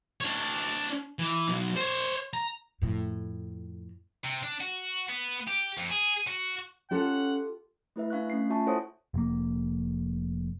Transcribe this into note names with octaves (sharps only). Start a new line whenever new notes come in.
D4 C#5
E3
B1 F#3
C5 C#5
A#5
F2 A2
C3
D4
F#4
B3
G4
F2
G#4
F#4
C#4 F4 G4 A4 F#5
A3 E4 B4 E5
D4 F5 C#6 F#6
A3 C#4 C7
F4 E5 G#5 A5 C#6
E4 A4 C5 C#5 F#5 D#6
F1 A#3